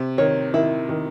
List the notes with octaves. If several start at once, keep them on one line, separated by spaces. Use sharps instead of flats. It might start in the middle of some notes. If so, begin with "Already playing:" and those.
Already playing: C3
D#3 C#5
D#3 E4
D#3